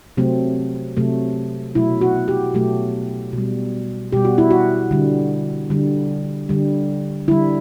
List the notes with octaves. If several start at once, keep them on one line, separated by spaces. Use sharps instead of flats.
C3 F#3 A3 C4
C3 F#3 A3
B2 F#3 A3 E4
F#4
G4
B2 F#3 A3 G4
B2 G3
B2 G3 G4
F#4
E4
F#4
D3 G3
D3 G3
D3 G3
D3 G3 E4